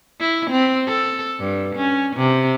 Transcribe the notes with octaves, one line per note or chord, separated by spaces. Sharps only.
E4
C4
A4
G2
C#4
C3